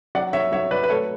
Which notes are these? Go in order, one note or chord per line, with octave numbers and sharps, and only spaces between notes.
F#3 D5 F#5
C#5 E5
F#3 C#5 E5
B4 D5
B4
A3 A4 C#5